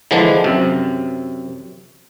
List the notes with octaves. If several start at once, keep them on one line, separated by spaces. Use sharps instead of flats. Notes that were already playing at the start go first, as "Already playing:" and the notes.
D3 E3 F3 G#3 D4
F#2 C3